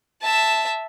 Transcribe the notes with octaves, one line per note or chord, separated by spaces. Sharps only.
E5 A5